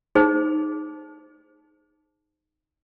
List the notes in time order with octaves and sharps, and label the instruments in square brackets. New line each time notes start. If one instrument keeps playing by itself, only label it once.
[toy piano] D#4 G#4 C5